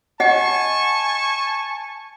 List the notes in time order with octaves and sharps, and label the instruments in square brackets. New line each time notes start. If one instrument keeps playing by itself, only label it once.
[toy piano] D#5 F#5 [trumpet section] G#5 A5 C#6